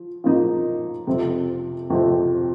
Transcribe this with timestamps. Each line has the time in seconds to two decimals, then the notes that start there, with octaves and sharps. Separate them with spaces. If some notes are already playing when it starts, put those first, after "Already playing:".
Already playing: F3
0.24 F3 A#3 D#4
1.07 F2 C3 F3 C4
1.90 F2 C3 F3 C4